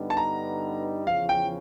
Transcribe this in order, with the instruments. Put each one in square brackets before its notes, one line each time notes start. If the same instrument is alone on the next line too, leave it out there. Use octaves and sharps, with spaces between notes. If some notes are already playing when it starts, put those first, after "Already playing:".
Already playing: [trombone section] G2 D3 G3 B3 D#4
[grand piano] A5
A#5
[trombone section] E2 C#3 F3 [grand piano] F5
[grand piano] G5